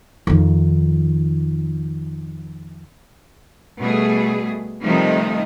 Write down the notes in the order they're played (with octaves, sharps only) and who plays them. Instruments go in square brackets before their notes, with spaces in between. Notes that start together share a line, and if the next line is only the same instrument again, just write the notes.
[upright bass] F2 D#3
[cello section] B2 G3 A3 G#4
C3 D#3 F3 G3 A3 D#4